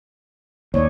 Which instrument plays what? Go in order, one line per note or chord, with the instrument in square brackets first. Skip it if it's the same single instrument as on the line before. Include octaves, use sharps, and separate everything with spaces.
[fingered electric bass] D#2 [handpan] C#5 D5